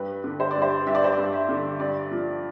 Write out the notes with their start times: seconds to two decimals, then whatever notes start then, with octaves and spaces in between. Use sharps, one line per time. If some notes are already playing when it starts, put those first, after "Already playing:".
Already playing: G2 B4
0.24 D3
0.40 C5
0.51 G2 D5
0.62 C5
0.86 G2 E5
0.95 D5
1.04 C5
1.13 G2 D5
1.33 E5
1.49 D3
1.80 G2 D5
2.11 F3